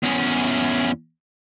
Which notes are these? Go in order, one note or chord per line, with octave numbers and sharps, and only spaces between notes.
E2 C#4